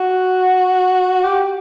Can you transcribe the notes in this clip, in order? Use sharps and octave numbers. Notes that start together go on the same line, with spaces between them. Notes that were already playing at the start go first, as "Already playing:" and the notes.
Already playing: F#4
G4